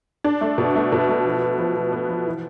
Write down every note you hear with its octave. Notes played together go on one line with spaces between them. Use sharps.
D4
A3
B2
A3
B2
A3
F3
B3
F3
F3
B3
F3
E3